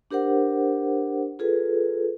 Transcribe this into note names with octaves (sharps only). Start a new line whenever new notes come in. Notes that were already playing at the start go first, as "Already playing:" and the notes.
D4 G4 A#4 C5 F#5
F4 G#4 A4 B4